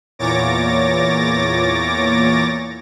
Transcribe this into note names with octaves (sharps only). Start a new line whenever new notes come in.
E2 A#2 C#5 D6 A6 A#6